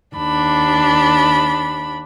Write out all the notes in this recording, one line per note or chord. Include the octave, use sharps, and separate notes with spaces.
D#2 D4 B5